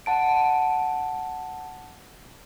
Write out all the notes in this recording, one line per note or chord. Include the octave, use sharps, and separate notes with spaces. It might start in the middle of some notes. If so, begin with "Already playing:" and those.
F#5 A5 D7